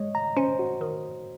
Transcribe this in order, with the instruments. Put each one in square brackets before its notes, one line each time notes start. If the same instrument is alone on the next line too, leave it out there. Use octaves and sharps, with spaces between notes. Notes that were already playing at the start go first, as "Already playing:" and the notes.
Already playing: [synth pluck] G#3 [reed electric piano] C#5 D#5
[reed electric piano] A#5
[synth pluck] C#4 [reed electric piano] C5
[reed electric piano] F#4
[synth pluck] D#3